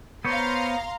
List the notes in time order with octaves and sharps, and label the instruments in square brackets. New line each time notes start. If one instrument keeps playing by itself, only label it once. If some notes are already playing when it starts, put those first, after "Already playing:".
[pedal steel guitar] B3 C5 C#5 [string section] F5 A#5 C6